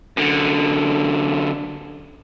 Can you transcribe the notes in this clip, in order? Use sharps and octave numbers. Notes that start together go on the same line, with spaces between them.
F#2 D3